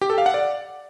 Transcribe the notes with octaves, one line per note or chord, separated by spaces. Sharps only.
G4
A4
F5
F#5
D5